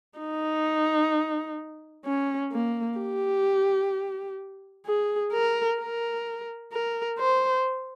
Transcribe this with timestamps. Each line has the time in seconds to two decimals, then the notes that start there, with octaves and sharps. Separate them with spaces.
0.19 D#4
2.06 C#4
2.52 A#3
2.99 G4
4.86 G#4
5.33 A#4
5.79 A#4
6.72 A#4
7.19 C5